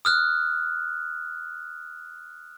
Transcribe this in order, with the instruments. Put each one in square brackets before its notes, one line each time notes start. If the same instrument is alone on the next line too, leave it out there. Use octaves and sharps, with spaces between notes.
[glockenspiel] D#6 F6 F#6